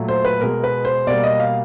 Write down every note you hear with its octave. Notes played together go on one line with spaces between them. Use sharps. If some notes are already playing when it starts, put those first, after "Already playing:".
Already playing: A#2 F#3 A3
C5
B4
B2 G#3 A#4
B4
C5
B2 G3 A#3 D5
D#5
F5